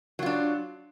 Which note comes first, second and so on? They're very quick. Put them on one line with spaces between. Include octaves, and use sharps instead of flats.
F#3 F4 D4